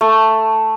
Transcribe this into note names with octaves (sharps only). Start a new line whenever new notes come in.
A3